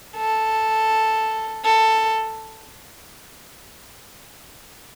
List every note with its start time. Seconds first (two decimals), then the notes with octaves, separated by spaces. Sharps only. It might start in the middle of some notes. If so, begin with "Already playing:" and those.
0.16 A4
1.65 A4